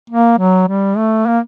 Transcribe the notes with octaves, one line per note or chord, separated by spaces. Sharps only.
A#3
F#3
G3
A3
A#3